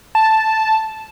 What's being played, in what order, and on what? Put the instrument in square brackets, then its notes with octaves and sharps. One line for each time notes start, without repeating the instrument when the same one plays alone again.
[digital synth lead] A5